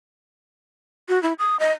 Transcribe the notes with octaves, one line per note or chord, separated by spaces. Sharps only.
F#4
E4
D#6
D#5